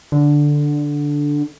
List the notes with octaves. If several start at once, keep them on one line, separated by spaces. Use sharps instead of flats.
D3